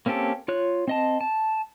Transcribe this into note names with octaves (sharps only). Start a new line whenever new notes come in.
A#3 C4 C#4 G4 A4
F4 C#5 F#6
C4 D#5 A5
A5